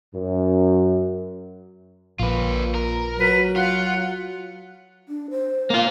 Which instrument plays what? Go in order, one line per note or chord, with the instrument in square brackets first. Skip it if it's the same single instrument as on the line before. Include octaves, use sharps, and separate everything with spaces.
[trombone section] F#2
[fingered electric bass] A#1 [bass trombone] A#2 [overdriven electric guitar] F4 B4
[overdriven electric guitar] A#4
[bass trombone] F#3 [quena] B4
[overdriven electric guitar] F4 [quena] F#5
[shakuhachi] D4
C5
[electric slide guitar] A#3 F4